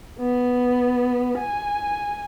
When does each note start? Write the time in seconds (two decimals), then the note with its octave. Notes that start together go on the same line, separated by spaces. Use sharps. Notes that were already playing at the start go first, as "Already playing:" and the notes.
0.19 B3
1.39 G#5